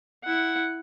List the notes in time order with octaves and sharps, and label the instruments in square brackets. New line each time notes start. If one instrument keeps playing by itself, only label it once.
[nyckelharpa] E4 F#5